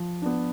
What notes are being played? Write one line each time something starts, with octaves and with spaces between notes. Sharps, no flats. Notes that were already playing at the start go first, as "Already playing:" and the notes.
Already playing: F3
B3 D4